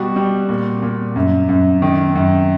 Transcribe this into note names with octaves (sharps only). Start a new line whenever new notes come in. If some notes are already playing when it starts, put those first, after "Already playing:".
Already playing: B2 G3 F#4
G3
A#2
A#2
F#2
F#2
D#3
F#2